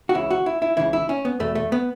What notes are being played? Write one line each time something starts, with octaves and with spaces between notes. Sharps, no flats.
F#4
C#2 C#3 E3 E4
F#4
E4
E4
C#2 C#3 E3 E4
E4
C#4
B3
E2 B2 A3
A3
B3